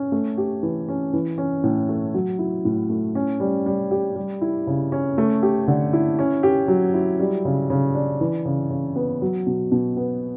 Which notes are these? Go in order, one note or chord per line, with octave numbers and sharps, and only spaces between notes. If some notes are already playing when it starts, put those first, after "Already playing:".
Already playing: C#4
A3
G4
E3
C#4
E3
C#4
A2
A3
F#3
E4
A2
A3
C#4
G3
G3
G4
G3
E4
C#3
C#4
A3
G4
D3
E4
C#4
G4
F#3
E4
G3
C#3
C#3
D4
E3
C#3
C#3
B3
F#3
B2
B2
B3